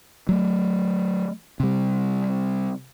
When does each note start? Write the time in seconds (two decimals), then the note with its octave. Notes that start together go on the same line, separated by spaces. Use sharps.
0.29 F#3 A3
1.60 C3 G3